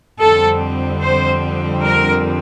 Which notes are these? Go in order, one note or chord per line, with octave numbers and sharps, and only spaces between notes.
F2 D3 G3 C4 A4
C5
A#4